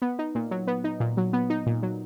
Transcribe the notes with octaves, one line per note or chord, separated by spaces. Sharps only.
B3
D#4
A#2
F#3
B3
D#4
A#2
F#3
B3
D#4
A#2
F#3